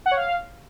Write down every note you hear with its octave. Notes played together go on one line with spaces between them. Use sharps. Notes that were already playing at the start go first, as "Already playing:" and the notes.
F#5
C#5
F5